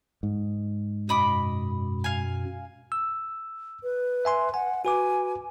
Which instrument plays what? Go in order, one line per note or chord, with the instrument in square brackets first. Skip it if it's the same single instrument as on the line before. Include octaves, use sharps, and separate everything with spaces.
[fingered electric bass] G#2
[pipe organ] F#2 B2 [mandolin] D#5 B5 D6
[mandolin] F5 G#5
[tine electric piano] E6
[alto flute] B4
[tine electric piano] E5 G#5 C6
[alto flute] F#5 [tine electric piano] G#5
[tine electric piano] F#4 B4 D6 [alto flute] G#5